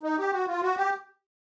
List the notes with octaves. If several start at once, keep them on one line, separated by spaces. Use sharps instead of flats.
D#4
G4
F#4
F4
F#4
G4